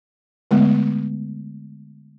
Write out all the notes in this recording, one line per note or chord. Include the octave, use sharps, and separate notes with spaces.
D3 G#3 A3 B3